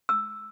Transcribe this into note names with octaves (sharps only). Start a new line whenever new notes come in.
E6